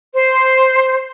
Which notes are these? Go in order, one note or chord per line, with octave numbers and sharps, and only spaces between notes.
C5